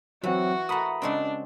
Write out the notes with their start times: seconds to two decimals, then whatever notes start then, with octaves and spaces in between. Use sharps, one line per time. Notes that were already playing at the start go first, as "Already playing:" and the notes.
0.24 E3 F#3 C4 F#4
0.69 A3 A#4 A#5 B5 D#6
1.02 C#3 G#3 C4 D4